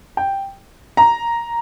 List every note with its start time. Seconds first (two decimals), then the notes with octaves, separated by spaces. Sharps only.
0.17 G5
0.97 A#5